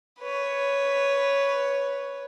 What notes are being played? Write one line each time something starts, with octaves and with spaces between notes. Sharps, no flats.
B4 C#5